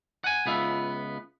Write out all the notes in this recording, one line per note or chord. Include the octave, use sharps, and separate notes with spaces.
F#5 G#5
C#2 B3 F4 E5